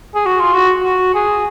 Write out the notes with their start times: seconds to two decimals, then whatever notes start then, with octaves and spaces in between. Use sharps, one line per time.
0.15 G#4
0.26 F#4
0.40 F4
0.54 F#4
0.84 F#4
1.14 G#4